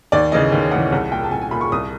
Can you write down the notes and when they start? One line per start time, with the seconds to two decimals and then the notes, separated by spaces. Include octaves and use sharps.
0.12 D#2 D5
0.32 C#3 E3 D#5
0.52 D#2
0.71 C#3 E3 F#5
0.92 C2 F#5
1.11 A#2 G5
1.24 A5
1.31 C2 G#5
1.42 G#5
1.51 A#2 B5
1.61 C#6
1.72 C2 D#6